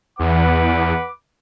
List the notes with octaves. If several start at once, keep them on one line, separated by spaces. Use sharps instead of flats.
E2 B4 F#5 D6